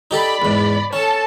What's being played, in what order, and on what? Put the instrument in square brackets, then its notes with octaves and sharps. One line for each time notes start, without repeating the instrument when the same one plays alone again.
[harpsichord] D#4 G4 A4 [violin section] D5 B5
[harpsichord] E2 G#2
[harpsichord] C#4 [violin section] A4 A5